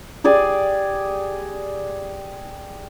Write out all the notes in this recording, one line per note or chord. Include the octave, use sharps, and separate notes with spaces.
G4 G#4 D5 G#5